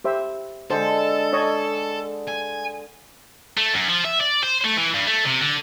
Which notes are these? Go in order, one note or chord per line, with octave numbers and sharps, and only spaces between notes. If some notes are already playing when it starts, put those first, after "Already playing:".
G4 C5 E5
D3 G#3 A4 C5
C#5 D#5
G#5
A3
F#2
F3
E5
D5
C5
A3
E3
G2
A3
C3
D3